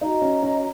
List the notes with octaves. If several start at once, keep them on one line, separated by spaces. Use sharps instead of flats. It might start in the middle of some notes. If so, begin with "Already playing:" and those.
D#4 F#4 D#5 A#5
C#4
C#4